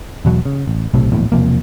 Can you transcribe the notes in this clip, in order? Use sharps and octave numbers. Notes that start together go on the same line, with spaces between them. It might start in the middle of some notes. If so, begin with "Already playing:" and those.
E2 B2 F#3
C#3
A1
B1 A2 C3
D1 A#1 E2 A2
E1 C3 F3 A#3